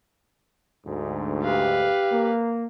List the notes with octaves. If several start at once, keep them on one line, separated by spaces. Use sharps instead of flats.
D2 G#2
G4 B4 F5
A#3